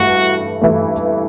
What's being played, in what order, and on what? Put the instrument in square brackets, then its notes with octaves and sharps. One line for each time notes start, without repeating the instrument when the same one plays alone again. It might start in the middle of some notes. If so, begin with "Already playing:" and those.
Already playing: [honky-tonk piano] G2 E3 A3 [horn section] F#4
[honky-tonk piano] G2 E3 A3